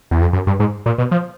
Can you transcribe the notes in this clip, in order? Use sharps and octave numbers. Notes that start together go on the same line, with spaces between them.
E2
F2
F#2
G2
G#2
A#2
B2
F3